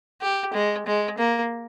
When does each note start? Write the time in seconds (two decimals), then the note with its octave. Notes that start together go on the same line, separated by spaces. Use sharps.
0.21 G4
0.54 G#3
0.86 G#3
1.18 A#3